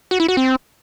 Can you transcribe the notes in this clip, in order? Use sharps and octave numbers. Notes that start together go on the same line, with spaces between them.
F#4
E4
F#4
C4